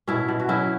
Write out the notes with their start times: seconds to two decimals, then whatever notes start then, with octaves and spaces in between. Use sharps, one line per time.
0.07 B2 C#4 E4
0.28 B2
0.40 F#4
0.48 F#3 C#4 E4